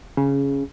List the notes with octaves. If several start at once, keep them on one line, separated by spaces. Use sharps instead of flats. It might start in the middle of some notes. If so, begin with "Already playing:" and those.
C#3